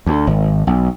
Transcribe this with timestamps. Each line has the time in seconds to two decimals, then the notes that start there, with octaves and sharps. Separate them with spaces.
0.06 D2
0.27 G#1
0.67 B1